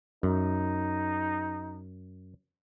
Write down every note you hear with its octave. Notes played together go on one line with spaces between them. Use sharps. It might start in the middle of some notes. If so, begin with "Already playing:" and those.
F#2 D#4